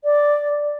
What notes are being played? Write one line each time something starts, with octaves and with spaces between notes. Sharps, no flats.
D5